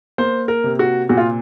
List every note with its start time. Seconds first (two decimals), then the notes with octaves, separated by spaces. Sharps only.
0.18 A#3 C5
0.48 A#4
0.64 C3
0.79 F#4
1.09 A#2 F#4
1.17 F4